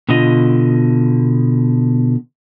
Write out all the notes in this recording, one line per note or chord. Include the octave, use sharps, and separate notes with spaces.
B2 D3 B3 F4 D#5